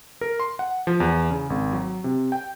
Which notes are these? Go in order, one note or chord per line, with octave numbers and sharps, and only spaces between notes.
A#4
C6
F#5
F3
E2
C#3
G#1
F#3
C3
G5